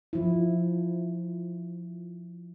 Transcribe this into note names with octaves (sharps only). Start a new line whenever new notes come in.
F3 E4